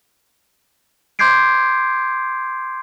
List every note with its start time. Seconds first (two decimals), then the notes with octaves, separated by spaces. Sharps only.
1.19 C6 D6 G6 G#6 C7 D7